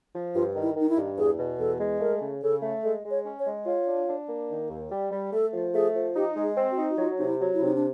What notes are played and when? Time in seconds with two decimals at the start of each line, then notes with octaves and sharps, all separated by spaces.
0.14 F3
0.34 G2 F4
0.56 D#3
0.62 E4
0.76 D#3 D#4
0.89 E4
0.96 G2
1.18 E2 G#4
1.38 B2
1.59 E2 A4
1.80 G#3
2.00 A3 A#4
2.21 C#3
2.42 C#3 A4
2.62 A3
2.83 G#3 A4
3.04 G#3
3.10 C#5
3.25 C#4
3.39 C#5
3.46 G#3
3.66 F4 C#5
3.87 D4
4.08 D4
4.29 A#3
4.49 D#3
4.70 D#2
4.90 G3
5.12 G3
5.32 A3 A4
5.53 F3
5.74 A3 G#4
5.95 F3
6.15 D#4 G4
6.36 G#3
6.43 G#4
6.57 C4
6.71 F#4
6.78 D#4
6.90 F#4
6.98 F#3 F4
7.18 C3 D#4
7.26 E4
7.40 F#3
7.54 E4
7.61 C3 D#4
7.75 D4